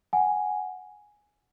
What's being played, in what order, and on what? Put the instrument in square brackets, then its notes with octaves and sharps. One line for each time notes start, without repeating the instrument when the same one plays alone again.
[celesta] F#5 G#5